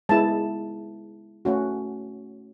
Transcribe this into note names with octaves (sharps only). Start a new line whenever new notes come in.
G#3 B3 E4 A5
A3 C#4 F#4